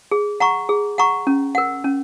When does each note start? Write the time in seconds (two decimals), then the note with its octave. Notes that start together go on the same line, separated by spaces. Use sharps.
0.11 G#4
0.40 F#5 A#5 C#6
0.69 G#4
0.98 F#5 A#5 C#6
1.27 C#4
1.55 A#4 F#5
1.84 C#4